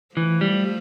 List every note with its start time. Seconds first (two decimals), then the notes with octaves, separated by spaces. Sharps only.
0.16 E3 F3 A3
0.41 G3